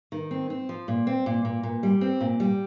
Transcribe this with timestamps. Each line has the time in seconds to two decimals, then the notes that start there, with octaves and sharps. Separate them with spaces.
0.12 D#3
0.31 C4
0.50 C4
0.69 F3
0.88 A#2
1.07 C4
1.26 A#2
1.45 A#2
1.63 A#2
1.83 G3
2.01 C4
2.21 A#2
2.40 G3